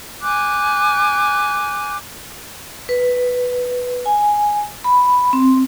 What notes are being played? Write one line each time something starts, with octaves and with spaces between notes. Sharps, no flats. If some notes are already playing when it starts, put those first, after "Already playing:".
G#5 D6 F#6 G6
B4
G#5
B5
C4